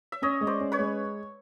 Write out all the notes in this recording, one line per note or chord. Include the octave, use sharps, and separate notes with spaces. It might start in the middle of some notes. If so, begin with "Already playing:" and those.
E5
C#4 C#5 D#5
G#3
C5 D5
C#4
B4 C#5
G#3